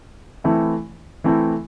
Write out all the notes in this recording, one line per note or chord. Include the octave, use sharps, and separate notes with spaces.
E3 A3 C4 E4
E3 A3 C4 E4